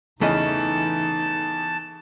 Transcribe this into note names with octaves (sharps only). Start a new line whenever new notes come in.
E2 C#3 E3 A3 D#4 E4 D#5 A5